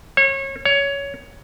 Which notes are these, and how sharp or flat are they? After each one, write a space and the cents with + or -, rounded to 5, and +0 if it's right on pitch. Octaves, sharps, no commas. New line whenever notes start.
C#5 -30
C#5 +15